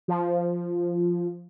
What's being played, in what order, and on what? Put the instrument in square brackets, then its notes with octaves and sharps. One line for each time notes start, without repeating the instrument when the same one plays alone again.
[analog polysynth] F3